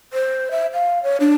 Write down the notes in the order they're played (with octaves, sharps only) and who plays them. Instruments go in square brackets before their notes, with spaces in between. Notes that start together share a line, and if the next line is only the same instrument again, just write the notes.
[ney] C5
E5
F5
C#5
D4